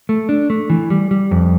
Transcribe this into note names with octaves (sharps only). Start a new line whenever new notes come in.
A3
D4
A3
E3
G3
G3
F2